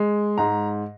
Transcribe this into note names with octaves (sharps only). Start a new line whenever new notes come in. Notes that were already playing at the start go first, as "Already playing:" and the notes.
Already playing: G#3
G#2 A#5